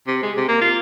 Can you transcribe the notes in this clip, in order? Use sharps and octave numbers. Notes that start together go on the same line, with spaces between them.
C3
G#3
C3
A#3
F4